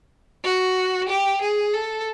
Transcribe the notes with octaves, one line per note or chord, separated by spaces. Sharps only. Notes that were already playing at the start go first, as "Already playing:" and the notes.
F#4
G4
G#4
A4